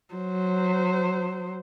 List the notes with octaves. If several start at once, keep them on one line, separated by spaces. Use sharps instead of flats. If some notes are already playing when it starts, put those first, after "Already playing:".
F#3 C5